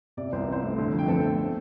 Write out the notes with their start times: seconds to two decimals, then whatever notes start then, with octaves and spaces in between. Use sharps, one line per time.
0.17 C3 D5
0.32 C2 C5
0.47 C4
0.52 C5
0.62 A3
0.78 D3
0.93 F2
0.99 G5
1.08 C4 A4 A5
1.23 A3
1.38 A3